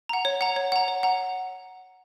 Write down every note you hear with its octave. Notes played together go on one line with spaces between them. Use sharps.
F#5 A#5
C#5
F#5 A#5
C#5
F#5 A#5
C#5
F#5 A#5